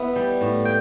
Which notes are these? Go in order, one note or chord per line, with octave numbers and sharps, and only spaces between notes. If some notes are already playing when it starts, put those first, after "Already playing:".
Already playing: B3 E4
G3
A2
G5